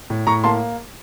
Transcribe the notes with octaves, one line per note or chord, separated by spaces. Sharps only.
A2
A2 A#5 C#6
A#3 A5 C6